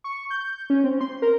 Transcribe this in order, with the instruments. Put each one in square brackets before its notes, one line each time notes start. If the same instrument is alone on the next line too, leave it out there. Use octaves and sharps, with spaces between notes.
[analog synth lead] C#6
G6
C#4
C4
C6
A#4